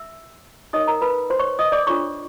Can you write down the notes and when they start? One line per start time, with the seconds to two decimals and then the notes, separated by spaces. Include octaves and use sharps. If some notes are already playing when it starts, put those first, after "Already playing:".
Already playing: E5 E6
0.73 D#4 G4 A#4 C#5 D#5 D#6
0.88 A#4 A#5
1.01 B4 B5
1.30 C5 C6
1.39 C#5 C#6
1.59 D#5 D#6
1.72 D5 D6
1.87 D4 F4 A4 C#5 C#6